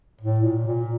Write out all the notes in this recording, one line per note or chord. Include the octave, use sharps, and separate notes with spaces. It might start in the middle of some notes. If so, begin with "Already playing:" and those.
A2
A#2
A#2